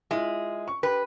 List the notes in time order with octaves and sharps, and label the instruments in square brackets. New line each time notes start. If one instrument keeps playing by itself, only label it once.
[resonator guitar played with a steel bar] G#3 [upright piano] E4 F4
[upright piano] C#6
[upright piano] G4 [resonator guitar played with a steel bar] B4